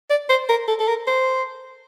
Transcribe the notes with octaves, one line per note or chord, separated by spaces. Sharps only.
D5
C5
A#4
A4
A4
A#4
C5